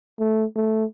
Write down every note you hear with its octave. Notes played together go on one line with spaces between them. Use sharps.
A3
A3